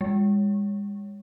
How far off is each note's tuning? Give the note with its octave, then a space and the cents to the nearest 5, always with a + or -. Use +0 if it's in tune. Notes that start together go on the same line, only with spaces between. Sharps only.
G#3 -40